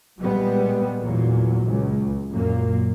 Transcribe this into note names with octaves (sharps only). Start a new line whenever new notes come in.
A#2 G3 G#3 B3
E2 A#2 F#3
C#2
F#2 A#2 A#3